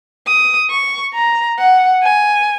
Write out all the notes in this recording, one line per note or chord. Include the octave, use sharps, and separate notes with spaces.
D#6
C#6
A#5
F#5
G#5